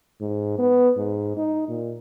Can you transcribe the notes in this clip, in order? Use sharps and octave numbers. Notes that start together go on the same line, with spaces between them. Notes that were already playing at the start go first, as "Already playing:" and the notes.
G#2
B3
G#2
D#4
A#2